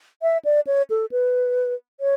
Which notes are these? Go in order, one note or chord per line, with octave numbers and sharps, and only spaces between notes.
E5
D5
C#5
A4
B4
C#5